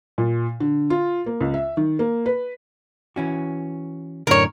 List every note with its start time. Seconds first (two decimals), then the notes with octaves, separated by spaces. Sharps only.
0.18 A#2
0.60 D3
0.90 F4
1.26 A#3
1.41 C#2
1.54 E5
1.77 D#3
1.99 A#3
2.26 B4
3.16 E3 C#4 F#4
4.27 F#2 A2 D3 A#4 C#5